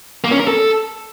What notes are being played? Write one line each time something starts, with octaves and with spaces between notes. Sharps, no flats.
A#3
C#4
A#4
A4